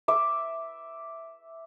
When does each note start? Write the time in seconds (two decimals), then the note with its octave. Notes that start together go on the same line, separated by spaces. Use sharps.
0.08 E5 D6